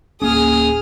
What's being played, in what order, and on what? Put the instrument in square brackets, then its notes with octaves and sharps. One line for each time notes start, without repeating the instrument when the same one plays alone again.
[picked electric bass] D1 A#3 C#4 [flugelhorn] G#4 [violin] D#6 F6